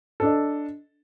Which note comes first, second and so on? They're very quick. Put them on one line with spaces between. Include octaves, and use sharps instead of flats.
A4 D4 D#5